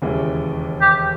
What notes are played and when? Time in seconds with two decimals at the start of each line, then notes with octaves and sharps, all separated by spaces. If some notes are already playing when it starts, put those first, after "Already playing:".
0.02 E1 D#2 C#3 E3 G#3
0.82 G4